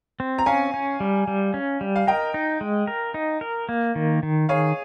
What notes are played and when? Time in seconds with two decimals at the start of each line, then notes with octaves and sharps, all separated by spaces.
0.20 C4
0.39 A#5
0.46 C#4 F5 G#5
0.74 C#4
1.00 G3
1.28 G3
1.54 C#4
1.81 G3
1.96 F5
2.07 A#4 D#5 G5
2.34 D#4
2.61 G#3
2.87 A#4
3.14 D#4
3.41 A#4
3.69 A#3
3.95 D#3
4.23 D#3
4.49 G#4 C#5 F5